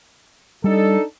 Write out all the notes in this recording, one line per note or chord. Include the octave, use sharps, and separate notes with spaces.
G3 D4 D#4 A4